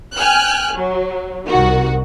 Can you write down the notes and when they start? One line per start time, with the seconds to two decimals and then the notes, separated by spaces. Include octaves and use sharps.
0.17 G5 G#5 F6 F#6
0.75 F#3
1.49 C2 D#3 F#4